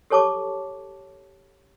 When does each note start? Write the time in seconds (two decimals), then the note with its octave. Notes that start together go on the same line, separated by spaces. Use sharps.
0.10 G4 A4 C#5 A5 C#6 D6